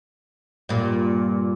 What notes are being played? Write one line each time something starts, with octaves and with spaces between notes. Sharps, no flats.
G2 A#2